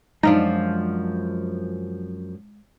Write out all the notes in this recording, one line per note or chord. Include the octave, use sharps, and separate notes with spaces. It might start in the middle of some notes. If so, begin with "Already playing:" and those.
F#2 F3 G#3 D4 D#4